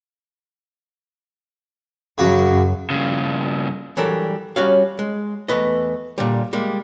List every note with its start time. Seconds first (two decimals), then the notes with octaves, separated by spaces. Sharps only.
2.18 F#2 C#3 F#4 D6
2.90 G2 C#3
3.97 E3 F#3 G3 D4 A4 A#4
4.56 G3 C#4 F#4 C#5 F5
4.99 G#3
5.48 E2 A3 B4 D#5
6.18 A#2 D3 G3
6.53 G3 G#3 A#3